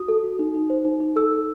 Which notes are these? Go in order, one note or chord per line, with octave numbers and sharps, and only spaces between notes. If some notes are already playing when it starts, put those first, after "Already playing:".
Already playing: F#4 D#6
A4
F#4
D#4
D#4
C5
D#4
D#4
A4 E6
A4